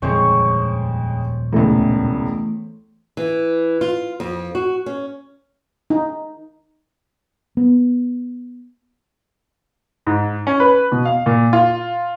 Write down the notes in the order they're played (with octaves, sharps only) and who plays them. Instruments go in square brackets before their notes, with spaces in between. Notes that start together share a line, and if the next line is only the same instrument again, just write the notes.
[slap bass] D#1 D3 F3 [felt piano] F2 G#3 [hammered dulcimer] C5 C#5 C#6
[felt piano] E1 C#2 [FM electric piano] E3 A3
[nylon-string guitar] E3
F4
F2
F#4
C#4
[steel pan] D#4
[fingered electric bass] B3
[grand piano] G#2
C#4
B4
B2
F5
A#2
F4